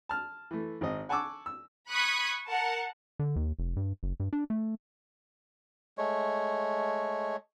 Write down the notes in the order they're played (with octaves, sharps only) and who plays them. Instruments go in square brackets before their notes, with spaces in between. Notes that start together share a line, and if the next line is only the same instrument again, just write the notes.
[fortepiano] A5 F6
E3 A3
G#1 C5 D#5
F#5 G#5 A5 C#6 D6 E6
E6
[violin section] B5 C#6 D#6 F#6 G#6 B6
A#4 F#5 A5
[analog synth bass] D3
D#2
F1
G2
F#1
G2
D4
A3
[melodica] G#3 A3 C#5